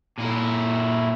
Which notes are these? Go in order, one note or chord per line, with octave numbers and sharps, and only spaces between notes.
A#2 E4